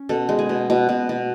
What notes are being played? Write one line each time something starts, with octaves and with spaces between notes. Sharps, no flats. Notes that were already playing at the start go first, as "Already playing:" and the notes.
Already playing: C#4
B2 A4
G#3
G#4
B2
B2
B2
B2